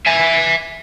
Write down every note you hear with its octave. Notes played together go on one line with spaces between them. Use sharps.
E5 G#5